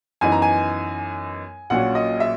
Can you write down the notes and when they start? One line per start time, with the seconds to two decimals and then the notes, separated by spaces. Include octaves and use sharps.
0.21 F#2 E3 B3 D#4 G#5
0.32 A#5
0.42 G#5
1.70 A#1 A#2 F#3 C#4 F#5
1.95 D#5
2.20 E5